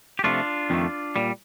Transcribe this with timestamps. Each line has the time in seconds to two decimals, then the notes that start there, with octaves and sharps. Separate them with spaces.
0.19 G4
0.24 C3 F3 A3 D4 F4
0.70 F2 D#3 A3
1.16 A#2 G3